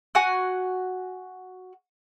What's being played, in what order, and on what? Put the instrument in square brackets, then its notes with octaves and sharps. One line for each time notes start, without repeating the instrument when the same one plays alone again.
[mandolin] F#4 F#5 G#5 F#6